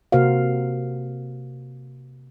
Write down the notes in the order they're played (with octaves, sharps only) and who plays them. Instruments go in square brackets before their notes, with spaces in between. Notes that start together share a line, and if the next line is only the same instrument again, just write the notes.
[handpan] C3 A#3 F#4 A#4 C5 F5